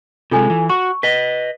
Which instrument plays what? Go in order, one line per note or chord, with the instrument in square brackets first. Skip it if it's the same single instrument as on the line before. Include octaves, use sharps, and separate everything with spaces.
[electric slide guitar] C3 G#3 [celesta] F4 A4 G#5
[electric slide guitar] E3
[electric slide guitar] F#4 [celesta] C#6
[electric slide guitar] B4 D#5 [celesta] B6